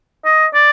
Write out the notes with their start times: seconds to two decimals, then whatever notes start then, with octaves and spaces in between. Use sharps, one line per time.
0.25 D#5
0.54 D5